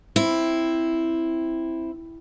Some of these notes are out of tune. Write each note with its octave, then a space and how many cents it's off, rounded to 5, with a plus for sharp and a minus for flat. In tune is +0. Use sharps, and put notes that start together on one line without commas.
C4 +0 E4 +0